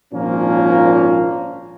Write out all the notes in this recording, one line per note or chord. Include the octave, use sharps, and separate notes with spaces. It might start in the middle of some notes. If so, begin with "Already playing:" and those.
G#1 A#2 F3 A#3 C#4 D4